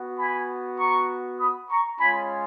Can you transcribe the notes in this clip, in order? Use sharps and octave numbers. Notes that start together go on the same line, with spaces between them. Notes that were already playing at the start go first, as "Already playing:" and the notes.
Already playing: B3 F#4
G#5 B5
A#5 C#6
B5 D#6
A#5 C#6
G#3 C#4 F4 G#5 B5